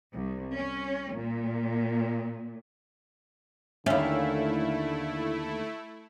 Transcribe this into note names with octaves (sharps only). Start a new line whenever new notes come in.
C2
C#4
A#2
D#2 D3 A3 C#4 E4 E5 F5